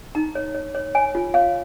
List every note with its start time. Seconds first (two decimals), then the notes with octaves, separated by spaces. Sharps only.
0.15 D#4 A#5
0.35 C#5
0.55 C#5
0.75 C#5
0.95 C#5 G#5
1.15 F4
1.34 C#5 F5